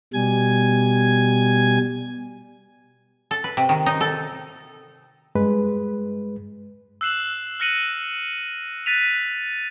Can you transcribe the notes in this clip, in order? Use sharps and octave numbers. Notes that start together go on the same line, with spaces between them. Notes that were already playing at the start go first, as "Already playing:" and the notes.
B2 G3 G#5 G#6
A4
B4
C3
D#3
D#4
A4
G2 G#3 B4
E6 F#6 C7 E7 F#7
F6 F#6 A#6 C#7 D#7 F#7
F#6 A6 B6 D#7 F7